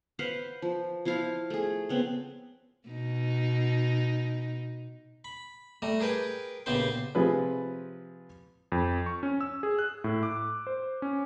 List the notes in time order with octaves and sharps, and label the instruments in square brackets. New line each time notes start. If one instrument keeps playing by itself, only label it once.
[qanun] B4 C5 F5 F#5
F3
F3 E4 F4 F5
A3 G#4
C#3 B3 C4
[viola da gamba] B2 D#4
[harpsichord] B5
G3 A3 A#5
G#4 A#4 B4 G5 G#5
A#1 C#3 B3 G4 C5 C6
[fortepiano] C3 F3 G#4 B4
[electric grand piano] F2
C#6
C#4
E6
G#4
F#6
A2
D6
C5
C#4